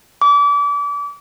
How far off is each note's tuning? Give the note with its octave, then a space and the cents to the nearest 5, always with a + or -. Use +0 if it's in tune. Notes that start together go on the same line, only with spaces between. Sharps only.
D6 -35